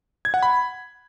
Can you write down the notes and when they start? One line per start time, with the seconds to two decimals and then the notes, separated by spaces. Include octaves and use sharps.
0.25 G#6
0.34 F#5
0.43 B5